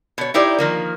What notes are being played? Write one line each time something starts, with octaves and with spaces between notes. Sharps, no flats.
B2 C#5
D#4 E4 G4 C5 D5
D#3 F3 A#3